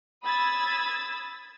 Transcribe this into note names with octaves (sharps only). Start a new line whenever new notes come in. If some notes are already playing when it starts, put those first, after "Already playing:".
B5 D#6 E6 G#6 A6